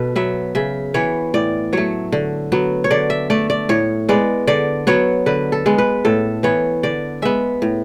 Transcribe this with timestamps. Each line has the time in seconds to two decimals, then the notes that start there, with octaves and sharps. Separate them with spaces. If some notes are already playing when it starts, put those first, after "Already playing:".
Already playing: B2 A4 B4
0.16 F#3 B3 E5
0.55 C#3 E5
0.94 E3 B3 C#5
1.34 A2 D5
1.73 F#3 A3 C#5
2.12 D3
2.52 F#3 B3
2.84 C#5
2.91 D3 D5
3.10 E5
3.30 A3 D5
3.50 D5
3.69 A2 C#5
4.09 G#3 B3 D5
4.47 D3 D5
4.87 F#3 B3 C#5
5.26 D3 B4
5.52 A4
5.66 G#3 B3
5.78 B4
6.05 A2 A4
6.43 E3 B3 C#5
6.83 D3 D5
7.22 G#3 B3 E5
7.62 A2